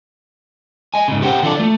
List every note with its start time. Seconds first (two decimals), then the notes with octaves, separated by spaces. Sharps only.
0.94 D#5 G#5
1.08 G#2 C#3
1.22 G4 A#4 C5 F#5 G5
1.42 D3 E3 E4 F4 A4 D5
1.60 A3